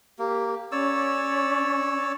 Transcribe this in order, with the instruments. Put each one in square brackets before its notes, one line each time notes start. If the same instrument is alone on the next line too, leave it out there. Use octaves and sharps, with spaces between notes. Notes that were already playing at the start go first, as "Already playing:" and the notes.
[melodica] A#3 [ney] G4
[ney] C#4 [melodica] C#5 D5 E6